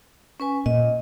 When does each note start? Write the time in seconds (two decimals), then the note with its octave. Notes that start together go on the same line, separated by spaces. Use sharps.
0.40 C#4 B4 G#5
0.66 A#2 D#5